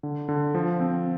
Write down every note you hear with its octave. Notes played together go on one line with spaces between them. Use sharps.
D3
D3
F3
C4